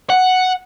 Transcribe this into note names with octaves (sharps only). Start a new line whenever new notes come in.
F#5